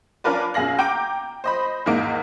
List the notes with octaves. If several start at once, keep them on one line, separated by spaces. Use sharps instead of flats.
C#4 D4 F4 A#4 B4 D5
F#2 B2 G#4 F5 A#6 F#7
G5 A#5 D6 D7
C5 D#5 B5
E2 G#2 D#3 A#3 D#5 D7